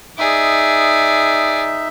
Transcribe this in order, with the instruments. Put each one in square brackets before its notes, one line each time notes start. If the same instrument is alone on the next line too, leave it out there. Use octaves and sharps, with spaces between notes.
[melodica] D#4 E5 [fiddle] G#4 D5